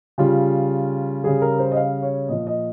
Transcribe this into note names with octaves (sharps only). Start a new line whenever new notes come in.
C#3 G3 F4
C#3 G3 G#4
A#4
C5
D#5
F5
C#5
A#2 F3 D#5
D#5